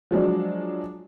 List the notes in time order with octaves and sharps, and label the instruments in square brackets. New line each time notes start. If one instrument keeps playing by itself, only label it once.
[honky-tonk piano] F3 F#3 G#3 D4